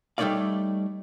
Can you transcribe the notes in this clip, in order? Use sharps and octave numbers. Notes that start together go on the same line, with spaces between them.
G3 A3 D#4 C#5 D5 F5